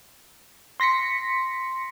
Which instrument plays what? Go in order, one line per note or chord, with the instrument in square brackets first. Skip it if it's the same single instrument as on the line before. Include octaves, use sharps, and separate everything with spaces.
[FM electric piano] C6 A#6 B6 C#7